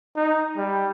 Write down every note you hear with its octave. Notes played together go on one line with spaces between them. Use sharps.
D#4
G3